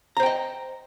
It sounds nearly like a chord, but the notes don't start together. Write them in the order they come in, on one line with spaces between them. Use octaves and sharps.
A#5 C5 G5 D#5